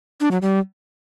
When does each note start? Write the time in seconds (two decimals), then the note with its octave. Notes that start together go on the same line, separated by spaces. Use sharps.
0.21 D4
0.31 F#3
0.42 G3